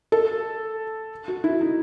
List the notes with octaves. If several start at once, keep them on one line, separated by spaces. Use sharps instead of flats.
A4
F#4
E4
D#4